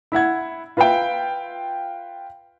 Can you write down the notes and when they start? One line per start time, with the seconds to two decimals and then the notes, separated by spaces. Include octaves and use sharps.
0.12 E4 E5 F#5 G#6
0.77 F4 B4 E5 F5 G5